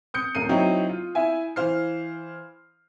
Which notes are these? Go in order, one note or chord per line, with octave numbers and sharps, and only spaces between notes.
D#6 G6 C#7
D#1 A#4 C7 D#7
F#3 C4 D#4 E4
F4
E4 E5 G#5
E3 C5 F5 F6 C7